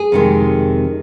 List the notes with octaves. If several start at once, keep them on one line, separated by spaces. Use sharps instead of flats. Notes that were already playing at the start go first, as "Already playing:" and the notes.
Already playing: G#4
F2 C3 D#3 G#3